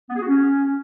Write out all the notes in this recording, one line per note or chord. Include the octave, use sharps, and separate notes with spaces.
B3
G#4
F#4
C#4